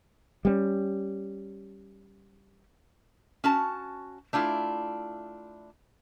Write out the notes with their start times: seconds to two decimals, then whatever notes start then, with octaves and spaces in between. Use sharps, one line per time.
0.45 G3 B3 C#4
3.44 C#4 F#4 A5
4.33 A3 D4 E4 F4